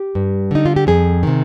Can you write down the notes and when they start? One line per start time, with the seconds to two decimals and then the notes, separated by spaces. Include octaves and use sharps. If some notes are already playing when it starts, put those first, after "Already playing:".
Already playing: G4
0.15 G2
0.51 D3 D#4
0.66 F4
0.76 G4
0.87 F2 G#4
1.23 C3 D#3